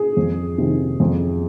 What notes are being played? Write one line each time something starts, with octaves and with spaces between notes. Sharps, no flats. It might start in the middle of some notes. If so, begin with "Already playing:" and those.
Already playing: G#4
F2
C3 D#3
F2